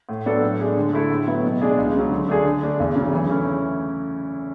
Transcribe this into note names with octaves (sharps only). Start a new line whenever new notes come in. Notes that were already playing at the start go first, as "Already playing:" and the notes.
A2
F#3 B3 D4 A4
A2
G#3 D4 G#4
D3
A3 E4 A4
A2
F#3 B3 E4
B2
G#3 D4 G#4
C#2
C#3 F#3
D3
A3 D4 G#4
D3
A3 D4
E2
C#3 F#3
E3
A3 C#4 E4